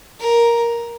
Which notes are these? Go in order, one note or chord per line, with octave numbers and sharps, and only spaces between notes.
A#4